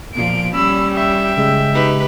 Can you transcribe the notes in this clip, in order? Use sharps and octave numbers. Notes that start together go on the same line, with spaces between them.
A#2 F3 D7
G3 C#4 B5 E6
E5 G5
C#3 G#3
D#4 G4 B4